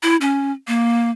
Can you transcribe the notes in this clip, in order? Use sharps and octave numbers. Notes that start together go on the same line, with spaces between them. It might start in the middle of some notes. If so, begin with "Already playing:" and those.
E4
C#4
A#3